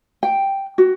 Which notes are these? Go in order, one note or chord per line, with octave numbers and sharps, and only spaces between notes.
G5
F#4